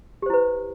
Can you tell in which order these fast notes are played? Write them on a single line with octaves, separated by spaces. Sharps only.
G4 C5 E4 B4